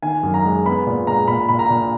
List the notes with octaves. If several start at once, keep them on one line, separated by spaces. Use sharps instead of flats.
D#3 G#5
F#2
A#5
G#3
B3 B5
A#2
G#3 A#5
A#2 B5
A#2 B5
A#5
A#2